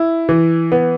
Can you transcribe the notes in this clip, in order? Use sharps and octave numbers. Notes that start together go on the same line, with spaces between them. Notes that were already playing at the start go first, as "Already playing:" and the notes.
Already playing: E4
E3
B3